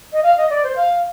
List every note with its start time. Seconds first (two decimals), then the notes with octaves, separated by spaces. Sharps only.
0.13 D#5
0.23 F5
0.37 D#5
0.50 D5
0.63 C5
0.76 F5